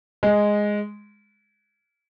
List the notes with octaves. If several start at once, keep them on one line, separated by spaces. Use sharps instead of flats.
G#3